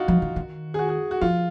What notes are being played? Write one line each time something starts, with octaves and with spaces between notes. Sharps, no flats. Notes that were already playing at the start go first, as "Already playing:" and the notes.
Already playing: D#4 F4 F#4
F3
D#3
D#3
G#4
F#4
G#4
F#4
F3 F4